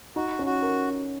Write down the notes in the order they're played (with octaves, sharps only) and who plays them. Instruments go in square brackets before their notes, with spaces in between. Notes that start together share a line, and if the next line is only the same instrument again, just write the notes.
[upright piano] D#4 [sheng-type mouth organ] F#4
[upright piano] C#4
[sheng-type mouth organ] F#4
[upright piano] A#4